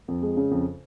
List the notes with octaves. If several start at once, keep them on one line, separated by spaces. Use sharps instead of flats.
F2
G#3
C#3
F2